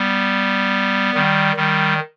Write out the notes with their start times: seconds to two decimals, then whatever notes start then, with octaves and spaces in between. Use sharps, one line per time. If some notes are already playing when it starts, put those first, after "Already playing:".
Already playing: G3 B3
1.15 D#3 G3
1.56 D#3 G3